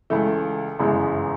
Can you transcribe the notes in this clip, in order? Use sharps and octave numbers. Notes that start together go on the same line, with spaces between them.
C#2 C#3 E3 A3
G1 F#2 C#3 E3 G#3